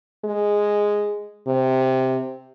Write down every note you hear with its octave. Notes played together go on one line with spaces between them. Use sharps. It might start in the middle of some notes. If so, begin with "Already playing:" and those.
G#3
C3